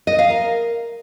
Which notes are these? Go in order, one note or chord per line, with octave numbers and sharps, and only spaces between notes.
D#5
F5
A#4